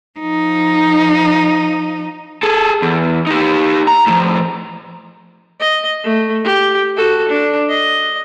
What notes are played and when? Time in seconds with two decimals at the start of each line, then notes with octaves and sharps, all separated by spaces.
0.20 F3 D#4
2.43 G#4 A4
2.82 E2
3.27 D#4 G4
3.87 A#5
4.07 A2 F3
5.60 D#5
6.04 A3
6.44 G4
6.97 F#4 A4
7.29 D4
7.69 D#5